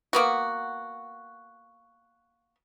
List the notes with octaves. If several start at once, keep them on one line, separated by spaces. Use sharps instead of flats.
A#3 B3 F#4